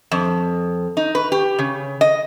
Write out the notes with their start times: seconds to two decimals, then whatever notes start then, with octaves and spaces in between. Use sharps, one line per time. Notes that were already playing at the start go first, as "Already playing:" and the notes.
0.12 F2
0.97 D#4
1.15 B4
1.32 G4
1.59 C#3
2.01 D#5